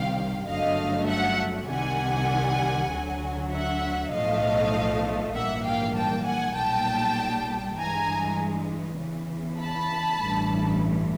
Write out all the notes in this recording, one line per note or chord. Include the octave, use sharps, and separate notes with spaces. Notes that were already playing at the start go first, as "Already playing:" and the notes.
Already playing: C2 C3 D#3 G3 F5 G5
G1 F#2 D3 F#3 A3 D#5 F5
E5 F#5
C2 C3 D#3 G3 F#5 G#5
D2 D3 F#3
E5 F#5
B1 A2 F3 A3 D#5 F5
A#1 G#2 E3 G3 A#3 E5 F#5
F5 G5
G5 A5
F#5 G#5
B1 A#2 G3 G5 A5
G2 E3 G#3 G#5 A#5
E2 C#3 E3
A5 B5
A1 G2 E3 A3